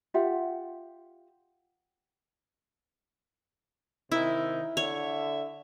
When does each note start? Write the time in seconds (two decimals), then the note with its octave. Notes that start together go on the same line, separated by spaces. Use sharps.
0.14 F4 G4 E5 F#5
4.12 C3 D#3 D#4 E4
4.77 D3 C#5 E5